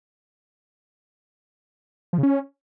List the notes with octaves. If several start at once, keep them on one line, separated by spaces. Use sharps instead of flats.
F3
C#3
C#4